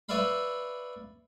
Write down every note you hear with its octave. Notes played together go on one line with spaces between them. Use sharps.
B4 C#5 D5 E5 F5 B5